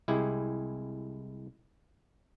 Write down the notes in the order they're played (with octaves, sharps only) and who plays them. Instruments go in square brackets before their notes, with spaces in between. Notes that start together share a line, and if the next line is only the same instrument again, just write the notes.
[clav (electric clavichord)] C2 G#3 E4 G4 G#4